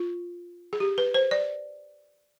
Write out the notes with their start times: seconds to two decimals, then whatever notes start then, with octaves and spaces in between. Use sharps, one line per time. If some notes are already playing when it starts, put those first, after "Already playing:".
Already playing: F4
0.73 G#4
0.80 G4
0.98 B4
1.14 C5
1.31 D5